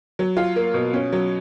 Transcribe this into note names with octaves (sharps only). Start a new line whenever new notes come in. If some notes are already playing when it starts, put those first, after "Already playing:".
F#3
F4
A#3
B2
C#4
F#3